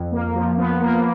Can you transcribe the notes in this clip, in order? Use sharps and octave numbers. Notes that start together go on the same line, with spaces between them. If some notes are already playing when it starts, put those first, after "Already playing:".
Already playing: F2
A#3
F3
F3 B3
A#3